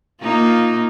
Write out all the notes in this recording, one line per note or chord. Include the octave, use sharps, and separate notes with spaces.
A#3 D#4 F4